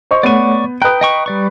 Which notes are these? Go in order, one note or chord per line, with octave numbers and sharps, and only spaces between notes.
C5 D#5 C#6
A3 B3 C#5 D5 F#5 C#6 D#7
B4 G5 A#5 D#6 F#6
D#5 G5 C#6
G3 D5 C#6